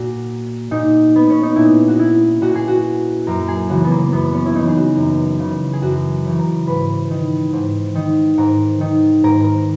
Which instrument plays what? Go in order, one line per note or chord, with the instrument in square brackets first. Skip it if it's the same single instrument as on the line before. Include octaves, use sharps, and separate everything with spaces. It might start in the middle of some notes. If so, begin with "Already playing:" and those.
Already playing: [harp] A#2 F#4
A#2 D#4
B3
C#4
D#4
A#2 E4
F#4
E4
A#2 F#4
G#4
F#4
F#2 A#4
G#4
C#3 E3 F#4
B3
A#3
F#2 B3
C#4
E4
C#3 E3 D#4
G#4
F#4
F#2 A#4
C#3 E3
G#4
F#2 F#4
C#3 E3
A#4
G#2 B4
D#3
G#2
D#3
G#2 A#4
D#3
G#2 A#4
A#4